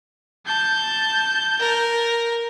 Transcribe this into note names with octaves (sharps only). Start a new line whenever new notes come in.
A5 G6
A#4